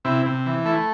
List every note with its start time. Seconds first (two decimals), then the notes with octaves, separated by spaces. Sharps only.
0.05 C3 E4
0.26 C3
0.46 E3
0.65 A3 E4